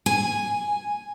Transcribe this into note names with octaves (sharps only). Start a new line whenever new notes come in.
G#5